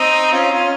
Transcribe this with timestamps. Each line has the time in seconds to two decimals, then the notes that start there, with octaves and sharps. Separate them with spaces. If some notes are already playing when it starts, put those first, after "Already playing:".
Already playing: C4 D#4
0.32 C#4 F4
0.51 C#4 F4